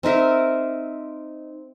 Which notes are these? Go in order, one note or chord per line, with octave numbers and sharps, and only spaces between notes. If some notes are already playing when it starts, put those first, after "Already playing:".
C4 D#4 A#4 E5